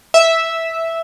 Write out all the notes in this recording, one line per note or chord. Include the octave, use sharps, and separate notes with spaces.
E5